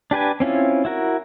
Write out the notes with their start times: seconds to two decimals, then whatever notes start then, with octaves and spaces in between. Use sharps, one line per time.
0.11 D4 G4 B4 G#5
0.40 C4 C#4 E4 F4
0.85 E4 F#4 A#4